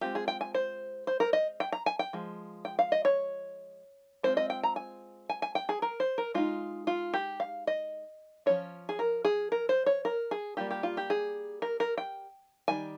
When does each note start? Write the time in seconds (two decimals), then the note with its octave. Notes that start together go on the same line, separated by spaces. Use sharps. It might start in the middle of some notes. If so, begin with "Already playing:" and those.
0.01 G#3 C4 F4 G4
0.15 G#4
0.28 G5
0.41 G#5
0.54 C5
1.07 C5
1.20 A#4
1.33 D#5
1.60 G5
1.72 A#5
1.86 G#5
1.99 G5
2.13 F3 G#3
2.65 G5
2.79 F5
2.92 D#5
3.05 C#5
4.23 G#3 C4 F4 C5
4.37 D#5
4.50 G5
4.63 A#5
4.76 G#5
5.29 G#5
5.42 G#5
5.55 G5
5.69 G#4
5.82 A#4
6.00 C5
6.18 A#4
6.34 G#3 D#4 F4
6.87 F4
7.14 G4
7.40 F5
7.67 D#5
8.46 F3 A#3 C#4 F4 C#5
8.89 G#4
8.99 A#4
9.25 G#4
9.52 A#4
9.69 C5
9.86 C#5
10.05 A#4
10.31 G#4
10.57 G3 A#3 F4 G4
10.71 G4
10.83 F4
10.97 G4
11.10 G#4
11.62 A#4
11.80 A#4
11.98 G5
12.68 D#3 G3 G#5